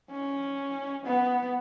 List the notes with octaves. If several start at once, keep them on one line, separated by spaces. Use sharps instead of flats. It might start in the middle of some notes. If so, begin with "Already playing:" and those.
C#4
B3